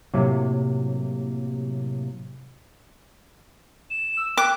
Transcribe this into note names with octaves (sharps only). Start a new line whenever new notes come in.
A2 C3 F#3 A#3
E7
E6
G5 D6 F#6